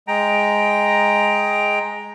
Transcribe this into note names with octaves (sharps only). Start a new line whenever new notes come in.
G#3 G5 A#5